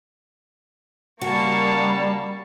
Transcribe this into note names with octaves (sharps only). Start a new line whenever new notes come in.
C#3 G3 A#3 F#4 A5 C#6